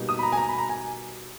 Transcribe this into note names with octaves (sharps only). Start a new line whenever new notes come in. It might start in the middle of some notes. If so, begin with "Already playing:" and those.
Already playing: B2 G3 A#3 D#4
D#6
B5
A#5
G#5
A#5
B5
A#5
G#5